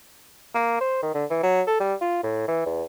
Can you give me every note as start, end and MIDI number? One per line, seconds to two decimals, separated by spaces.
0.54 0.80 58
0.81 1.02 72
1.03 1.11 51
1.14 1.25 50
1.30 1.43 52
1.43 1.62 54
1.67 1.79 69
1.80 1.94 55
2.01 2.21 65
2.23 2.45 45
2.48 2.66 52
2.66 2.83 40